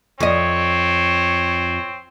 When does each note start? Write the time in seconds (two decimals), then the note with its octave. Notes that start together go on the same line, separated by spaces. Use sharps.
0.20 F2 C4 C#5 D#5